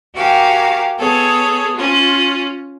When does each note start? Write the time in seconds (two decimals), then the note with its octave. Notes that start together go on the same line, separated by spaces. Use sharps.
0.16 F#4 G4 A#4 F5 G#5
0.99 B3 G#4 A4 C#5
1.76 C#4 F4